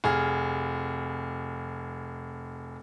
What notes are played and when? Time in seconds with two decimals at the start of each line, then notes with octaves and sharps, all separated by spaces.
0.04 F1 G#4 F6